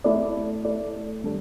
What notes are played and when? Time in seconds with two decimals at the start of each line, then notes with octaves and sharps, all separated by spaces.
0.04 A3 E4 A4 D5
0.65 A3 E4 A4 D5
1.24 G3 D4 A4